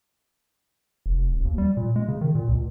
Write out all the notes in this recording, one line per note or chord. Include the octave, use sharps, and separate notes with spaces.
F1
D#1
D#2
G3
A#2
G#3
C#3
D#3
A#2
C#2